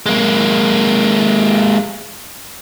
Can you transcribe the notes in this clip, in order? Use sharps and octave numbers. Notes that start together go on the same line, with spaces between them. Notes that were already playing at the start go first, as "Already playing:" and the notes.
G#3 A#3